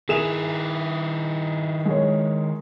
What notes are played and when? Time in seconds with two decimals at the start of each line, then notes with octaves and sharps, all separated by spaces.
0.09 D#3 E4 G#4 E7 F7
1.85 G#3 C#5